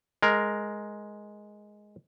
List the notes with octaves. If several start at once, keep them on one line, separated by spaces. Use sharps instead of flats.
G#3 A#4